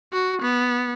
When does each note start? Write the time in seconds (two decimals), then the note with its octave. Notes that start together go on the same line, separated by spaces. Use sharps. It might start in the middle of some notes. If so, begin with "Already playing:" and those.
0.12 F#4
0.42 B3